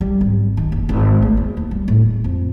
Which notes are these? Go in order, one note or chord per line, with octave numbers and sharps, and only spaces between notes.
G3
G#1
D#3
F#1
G#1
A3
E2
D#2
G3
A2
E1
F2